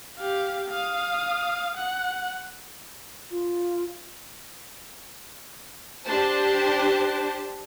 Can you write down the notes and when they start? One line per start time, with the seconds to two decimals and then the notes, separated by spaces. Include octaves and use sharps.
0.18 G4 F5
0.69 F5 D#6
1.77 F#5
3.30 F4
6.05 D4 G4 C5 A5